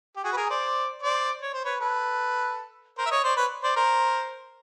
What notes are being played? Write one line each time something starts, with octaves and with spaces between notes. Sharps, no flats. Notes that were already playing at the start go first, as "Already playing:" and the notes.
G4
F#4 G#4
B4
G#4 A#4
C5 D5
C5 D5
C#5
C5
B4 C#5
A4 B4
A#4 C5
E5
C#5 D#5
C5 D5
B4 C#5
C5 D5
A#4 C5